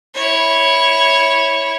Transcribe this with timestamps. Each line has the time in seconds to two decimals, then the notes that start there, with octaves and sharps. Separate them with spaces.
0.15 E4 C#5